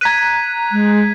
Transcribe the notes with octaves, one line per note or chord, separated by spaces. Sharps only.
A#5 F#6 G#6 B6 D#7
G#3